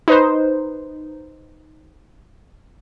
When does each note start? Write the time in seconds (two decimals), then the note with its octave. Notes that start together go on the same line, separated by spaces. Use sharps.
0.08 D#4 B4 C5